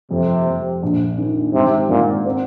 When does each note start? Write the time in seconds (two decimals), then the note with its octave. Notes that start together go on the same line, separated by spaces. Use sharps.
0.11 F2 C3
0.46 F2
0.83 A#1
1.18 D#3
1.54 G#1 C3
1.89 G#1 A#2
2.25 C4